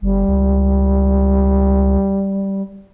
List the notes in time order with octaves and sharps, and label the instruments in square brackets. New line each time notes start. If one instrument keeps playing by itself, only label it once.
[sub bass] G1 [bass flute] G3
[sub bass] C#2